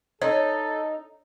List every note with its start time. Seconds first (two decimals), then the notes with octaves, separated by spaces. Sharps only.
0.22 D#4 A4 C#5